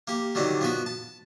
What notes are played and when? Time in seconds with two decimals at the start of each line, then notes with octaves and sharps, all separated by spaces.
0.08 A#3 G4
0.35 D3 D#3 F#3 G3 C4
0.61 F3 B3 F#4
0.86 A5